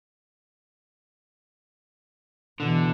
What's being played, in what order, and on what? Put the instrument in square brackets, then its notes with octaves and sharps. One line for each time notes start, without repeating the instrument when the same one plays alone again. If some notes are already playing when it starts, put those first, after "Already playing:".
[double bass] B2 E3 [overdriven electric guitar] D3